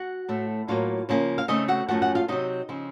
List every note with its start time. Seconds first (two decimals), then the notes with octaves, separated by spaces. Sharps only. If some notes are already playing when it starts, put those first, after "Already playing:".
Already playing: F#4 F#5
0.29 A2 A3 C4
0.68 A2 F#3 A#3 F4 F5
1.09 C#3 F3 A#3 C#4
1.38 F5
1.48 C#3 A3 C4 D#4 D#5
1.68 F#4 F#5
1.88 F#2 F3 A3 C#4 F#4 F#5
2.02 F#4 F#5
2.15 F4 F5
2.28 C3 F#3 C4 D#4 D#5
2.69 C#3 F3 C4